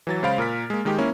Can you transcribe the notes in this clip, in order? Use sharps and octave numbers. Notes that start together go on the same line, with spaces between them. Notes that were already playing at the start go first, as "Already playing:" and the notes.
E3 F#3 A6
C#3 G#3 C5 F5 B5 D7
A#2 A#4 F6 B6
G#3 A#3
D#3 G#3 D#4 G4
A#3 C#4 E4